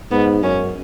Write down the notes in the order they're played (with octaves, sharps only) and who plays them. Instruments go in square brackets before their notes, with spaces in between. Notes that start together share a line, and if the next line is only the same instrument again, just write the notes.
[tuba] G#2 [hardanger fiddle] B3
[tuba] F#2 [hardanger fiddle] C#4